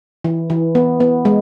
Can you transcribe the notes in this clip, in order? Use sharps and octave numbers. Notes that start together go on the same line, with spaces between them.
E3
E3
B3
B3
G#3